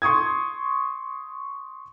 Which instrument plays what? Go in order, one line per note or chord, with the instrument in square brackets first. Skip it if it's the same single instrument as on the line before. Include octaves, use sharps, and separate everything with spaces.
[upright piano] C6 C#6 D#6 G#6